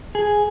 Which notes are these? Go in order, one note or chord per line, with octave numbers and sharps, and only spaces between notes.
G#4